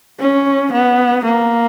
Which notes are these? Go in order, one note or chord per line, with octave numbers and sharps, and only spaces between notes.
C#4
B3
A#3